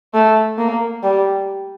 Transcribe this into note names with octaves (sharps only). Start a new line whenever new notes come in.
A3
A#3
G3